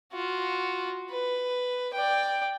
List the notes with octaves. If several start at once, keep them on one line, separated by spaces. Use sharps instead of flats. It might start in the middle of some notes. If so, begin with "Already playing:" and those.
F4 F#4
B4
D5 G5